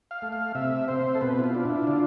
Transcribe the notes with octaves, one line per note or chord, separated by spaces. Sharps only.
F5
A3
F5
C3 E5
C4 C5
A4
B2 B4
E4
F4
D4
E4
D3 F4